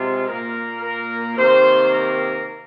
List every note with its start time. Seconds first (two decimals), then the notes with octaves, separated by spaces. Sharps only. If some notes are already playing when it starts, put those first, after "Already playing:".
Already playing: C3 G#3 F4
0.28 A#2 A#3 A#4
0.82 A#4
1.37 C3 D#3 A#3 C5
1.92 A#4